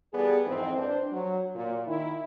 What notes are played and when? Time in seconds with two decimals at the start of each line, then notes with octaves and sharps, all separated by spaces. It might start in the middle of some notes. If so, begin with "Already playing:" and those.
0.13 E2 G3 B3 G#4 A4 D5
0.46 F2 G#2 E3 C4
0.77 D4 C5
1.12 F#3
1.56 A#2
1.87 D#3 E4